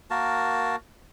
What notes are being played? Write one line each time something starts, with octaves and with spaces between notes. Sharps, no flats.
A#3 F#4 A#4 A5